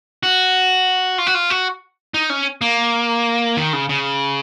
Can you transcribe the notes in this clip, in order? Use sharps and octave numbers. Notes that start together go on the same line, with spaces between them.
F#4
F4
F#4
F4
F#4
D#4
C#4
A#3
D#3
C#3
C#3